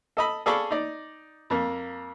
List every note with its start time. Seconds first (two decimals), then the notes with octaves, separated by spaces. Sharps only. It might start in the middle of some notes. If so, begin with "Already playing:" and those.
0.17 A4 D#5 B5
0.46 G#4 A4 D5 F5 B5 C#6
0.71 D#4 D5
1.50 F2 A#3